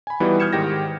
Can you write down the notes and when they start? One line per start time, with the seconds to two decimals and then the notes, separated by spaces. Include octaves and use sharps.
0.07 G#5 B5
0.20 E3 G3 B3 D#4 E4 F#4
0.40 D#6 F6 G6 G#6 C#7 E7
0.53 G#2 D#3 G4 G5 G#6 A#6